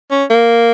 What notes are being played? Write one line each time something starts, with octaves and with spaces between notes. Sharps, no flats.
C#4
A#3